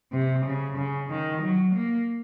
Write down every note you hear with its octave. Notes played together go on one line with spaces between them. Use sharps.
C3
C#3
C#3
D#3
F#3
A#3